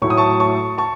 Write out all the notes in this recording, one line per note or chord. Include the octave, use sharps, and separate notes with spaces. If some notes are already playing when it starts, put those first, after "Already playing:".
A2 F#3 A3 E4 C#6
D#6
A5 C#6
A5 C#6
A5 C#6